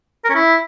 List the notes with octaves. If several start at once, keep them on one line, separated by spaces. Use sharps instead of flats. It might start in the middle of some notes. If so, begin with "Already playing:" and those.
A#4
C#4
E4